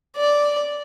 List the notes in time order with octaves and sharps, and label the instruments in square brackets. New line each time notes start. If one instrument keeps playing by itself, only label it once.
[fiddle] D5